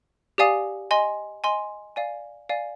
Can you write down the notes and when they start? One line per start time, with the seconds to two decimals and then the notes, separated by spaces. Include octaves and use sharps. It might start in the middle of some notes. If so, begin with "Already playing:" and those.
0.38 G4 D5 F5 G#5 D#6
0.91 D#5 G#5 C6
1.44 D#5 G#5 C6
1.96 D5 F5 G#5
2.49 D5 F5 G#5